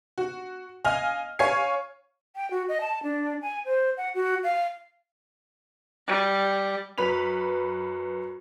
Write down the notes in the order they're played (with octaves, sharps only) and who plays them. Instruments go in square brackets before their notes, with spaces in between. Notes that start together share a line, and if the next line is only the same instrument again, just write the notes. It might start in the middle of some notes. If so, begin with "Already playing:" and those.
[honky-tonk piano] F#4
D#5 F5 G#5 F6
C#5 F5 G#5 G#6 C7
[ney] G5
F#4
D#5
A5
D4
G#5
C5
F#5
F#4
F5
[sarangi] G3
[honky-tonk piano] F#2 B4 B5 B6 F7